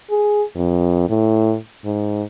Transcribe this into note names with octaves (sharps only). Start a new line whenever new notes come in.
G#4
F2
A2
G#2